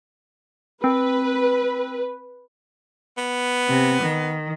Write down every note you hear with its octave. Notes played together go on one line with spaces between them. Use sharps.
C4 B4
B3
C3
D#3